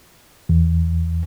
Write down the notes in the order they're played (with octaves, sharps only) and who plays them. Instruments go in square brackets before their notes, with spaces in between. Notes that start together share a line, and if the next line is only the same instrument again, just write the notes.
[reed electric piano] E2